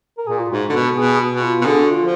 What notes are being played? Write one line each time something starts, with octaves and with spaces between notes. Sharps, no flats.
A#4
A#2 G#4
F4
G#2 F#4
D3
B2 F#4
B2 G#4
F#4
B2
F4
B2
D3 G#4
F#4
F4
F3